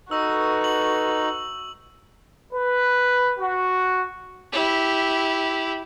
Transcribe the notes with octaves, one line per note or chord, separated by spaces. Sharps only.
D#4 F#4 A4 B4 C#6 E6
F#7
B4
F#4
E4 G4